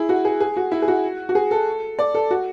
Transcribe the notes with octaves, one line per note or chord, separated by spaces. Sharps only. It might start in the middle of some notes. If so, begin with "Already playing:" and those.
Already playing: E4 G#4
F#4
G#4
G#4
F#4
E4
G#4
F#4
F#4
G#4
A4
D5
A4
F#4